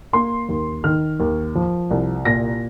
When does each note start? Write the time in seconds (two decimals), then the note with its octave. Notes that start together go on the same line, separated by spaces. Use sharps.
0.13 A#3 C6
0.49 D#2
0.84 D#3 F6
1.20 D#2
1.55 F3
1.91 C2
2.25 A#2 A#6